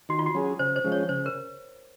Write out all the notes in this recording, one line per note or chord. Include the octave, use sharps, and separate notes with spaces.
D#3 F#4
F4
F#4
F#3 C#4 G#4
C#3 C5
C5
F3 G#3 C#4
C#5
C#3 C5
A#4